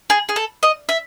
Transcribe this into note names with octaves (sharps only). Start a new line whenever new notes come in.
G#4
G#4
A4
D#5
E5